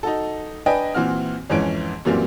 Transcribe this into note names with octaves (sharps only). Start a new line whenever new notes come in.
D#4 F#4 A4
D4 B4 D#5 G5 G#5
A#2 E3 C4 F#4 F6
F2 G#2 E3 C#4 D7
F#2 A#2 E3 G3 A#3 C4